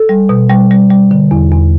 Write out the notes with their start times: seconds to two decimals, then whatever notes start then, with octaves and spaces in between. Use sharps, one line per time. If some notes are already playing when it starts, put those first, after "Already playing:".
Already playing: A4
0.09 G3
0.29 B2
0.49 G3
0.71 G3
0.91 G3
1.11 D3
1.31 E2
1.52 E2